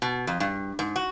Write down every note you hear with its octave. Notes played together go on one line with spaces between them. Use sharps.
B2
F2
G2
G#2
F#4